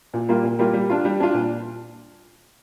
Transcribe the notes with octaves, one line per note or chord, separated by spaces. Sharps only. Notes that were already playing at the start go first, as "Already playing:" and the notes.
A#2
G3 A#3 F4
A#2
G3 A#3 F4
G3
D4 F4
G3
D4 F4
A#2